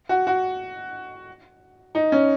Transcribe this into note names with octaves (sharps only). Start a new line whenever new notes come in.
F#4
F#4
D#4
C#4